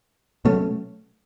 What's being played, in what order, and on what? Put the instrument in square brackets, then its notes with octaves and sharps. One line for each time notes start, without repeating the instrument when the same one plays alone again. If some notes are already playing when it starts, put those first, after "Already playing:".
[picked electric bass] B2 F#3 A3 C#4